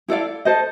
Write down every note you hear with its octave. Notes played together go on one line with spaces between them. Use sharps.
E4 A4 D5 F5
A4 C5 D#5